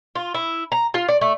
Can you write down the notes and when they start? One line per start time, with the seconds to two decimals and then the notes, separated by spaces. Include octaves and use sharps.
0.15 F4
0.34 E4
0.72 A#5
0.94 F4
1.08 D5
1.21 A3